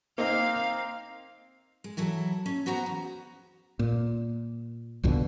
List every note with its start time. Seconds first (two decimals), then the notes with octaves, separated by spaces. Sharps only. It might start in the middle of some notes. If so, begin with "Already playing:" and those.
0.18 A#3 C4 D#4 F5
1.84 G#3
1.97 E3 F#3 E4 A4
2.46 C#4
2.66 B3 F#4 C5 F#5 A#5
2.86 E2
3.79 A#2
5.03 C2 F2 B2 D3